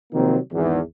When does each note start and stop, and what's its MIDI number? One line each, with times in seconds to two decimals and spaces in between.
0.13 0.37 48
0.13 0.37 51
0.13 0.37 53
0.13 0.37 54
0.13 0.37 58
0.13 0.37 60
0.52 0.80 32
0.52 0.80 40